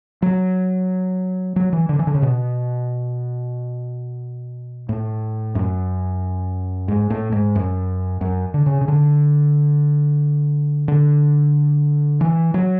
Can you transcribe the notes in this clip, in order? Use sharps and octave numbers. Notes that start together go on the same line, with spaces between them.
F#3
F#3
E3
D3
E3
D3
C#3
B2
A2
F#2
G#2
A2
G#2
F#2
F#2
D3
C#3
C#3
D3
D3
E3
F#3